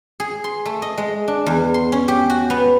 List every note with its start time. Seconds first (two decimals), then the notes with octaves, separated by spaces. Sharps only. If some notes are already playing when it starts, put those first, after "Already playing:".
0.20 G#4
0.44 C6
0.65 A3
0.82 D#5
0.98 G#3
1.28 D4
1.46 E2
1.74 C6
1.92 C#4
2.08 G4
2.30 F#4
2.50 B3